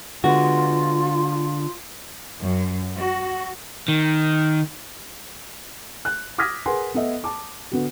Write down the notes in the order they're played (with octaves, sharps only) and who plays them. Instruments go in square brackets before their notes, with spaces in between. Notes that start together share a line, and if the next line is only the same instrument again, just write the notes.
[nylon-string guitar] D3 G#3 B3 [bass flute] F4 [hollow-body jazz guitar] F#4
[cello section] F#2
F#4
[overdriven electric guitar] D#3
[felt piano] F#6
D6 D#6 F6 G#6 A#6 B6
G#4 A#4 B4 F#5 G#5 C6
B3 A4 D#5 E5
A5 D6
D3 B3 F#4